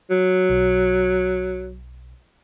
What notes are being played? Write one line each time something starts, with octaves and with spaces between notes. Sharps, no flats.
F#3
B1